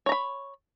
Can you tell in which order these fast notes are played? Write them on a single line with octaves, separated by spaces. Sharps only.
C#5 A#5 B5